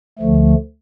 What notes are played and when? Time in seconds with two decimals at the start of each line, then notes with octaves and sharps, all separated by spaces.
0.19 D2 D3 F3 A3